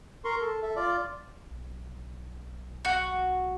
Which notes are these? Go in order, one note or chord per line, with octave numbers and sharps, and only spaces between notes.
A#4 C6 C#6
A4
A4 E5
F4 D5
B1
F#4